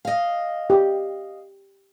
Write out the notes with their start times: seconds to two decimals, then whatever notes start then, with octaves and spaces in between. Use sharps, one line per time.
0.05 D#5 F5
0.70 G4